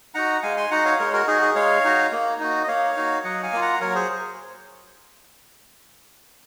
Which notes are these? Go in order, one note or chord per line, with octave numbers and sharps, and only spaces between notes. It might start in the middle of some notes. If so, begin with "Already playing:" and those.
D#4 F#4 F#5 A#5
G#3 F5 G#5
G#5 C6
D#4 F#4 F#5 A#5
C#5 F5
G#3 A#4 C#5
F#4 A#4
D#4 F#4 G#4
G#4
G#3 C#5 F5
D#4 F#4
A#3
D#4 F#4
D#5
A#3 C#5 F5
D#4 F#4
F#3 D#5 F#5
F5 G#5
A#3 F4
F#5 A#5
F#3 A#4 C#5
G#4 C5